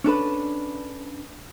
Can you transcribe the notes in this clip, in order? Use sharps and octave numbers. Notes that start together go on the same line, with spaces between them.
C#4 D4 A4 B4